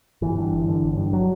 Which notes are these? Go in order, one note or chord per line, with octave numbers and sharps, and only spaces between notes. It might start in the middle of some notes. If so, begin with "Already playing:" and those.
G1 E3
G2
G1
D3
G1
G2
F#3